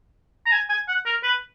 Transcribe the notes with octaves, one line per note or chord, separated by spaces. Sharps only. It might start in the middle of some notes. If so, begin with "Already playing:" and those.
A#5
G#5
G#5
F#5
A#4
B4